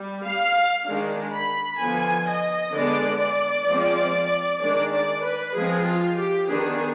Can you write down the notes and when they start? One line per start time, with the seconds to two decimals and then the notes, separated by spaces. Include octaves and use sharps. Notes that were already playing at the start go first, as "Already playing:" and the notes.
Already playing: G3
0.23 F5
0.86 D#3 G#3 D4
1.33 B5
1.80 D3 F3 B3 G#5
2.26 D#5
2.73 D3 G#3 B3 D5
3.67 F3 G#3 C4
4.60 D#3 G#3 D4 D5
4.92 D5
5.23 B4
5.54 F3 G#3 C4 G#4
5.85 F4
6.16 G4
6.48 D#3 B3 D4 G#4